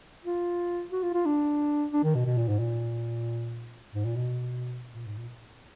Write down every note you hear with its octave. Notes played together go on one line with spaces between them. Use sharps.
F4
F#4
F4
F4
D4
D4
D#3
B2
B2
A#2
G#2
A#2
G#2
A#2
B2
A#2
G#2
A#2